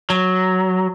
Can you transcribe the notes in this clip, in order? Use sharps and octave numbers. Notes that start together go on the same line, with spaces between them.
F#3